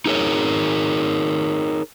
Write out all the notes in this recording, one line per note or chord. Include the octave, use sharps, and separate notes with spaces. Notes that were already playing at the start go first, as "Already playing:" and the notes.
D#4 G#4 A#4 C#5